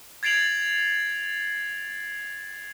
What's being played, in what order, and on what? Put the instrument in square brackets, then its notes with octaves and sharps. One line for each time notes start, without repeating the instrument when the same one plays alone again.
[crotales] G#6 A6 C7 D7 F7 F#7